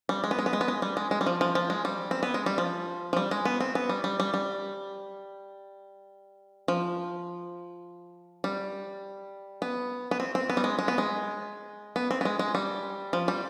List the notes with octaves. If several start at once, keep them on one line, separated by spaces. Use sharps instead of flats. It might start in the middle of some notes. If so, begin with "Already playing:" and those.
G3
G#3
B3
G#3
B3
G#3
B3
G#3
G3
G#3
G#3
G3
F3
F3
F3
G#3
G3
C4
B3
G#3
G3
F3
F3
G3
G#3
B3
C4
B3
G3
G3
G3
G3
F3
G3
B3
B3
C4
C4
B3
G3
G#3
G#3
B3
G#3
B3
C4
B3
G#3
G#3
G3
F3
G3